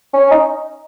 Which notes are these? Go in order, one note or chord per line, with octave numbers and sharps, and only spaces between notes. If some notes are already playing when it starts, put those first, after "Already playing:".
C#4
D#4